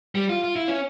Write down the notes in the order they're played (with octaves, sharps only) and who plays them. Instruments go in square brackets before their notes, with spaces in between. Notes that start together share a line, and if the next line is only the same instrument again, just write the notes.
[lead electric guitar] G3
F4
F4
E4
C#4